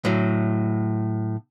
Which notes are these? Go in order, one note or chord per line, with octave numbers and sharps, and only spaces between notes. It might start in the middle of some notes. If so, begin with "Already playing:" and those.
A2 F#3